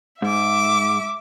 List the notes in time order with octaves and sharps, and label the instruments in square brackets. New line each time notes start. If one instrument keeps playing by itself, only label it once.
[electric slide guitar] G#2 [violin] E5 D6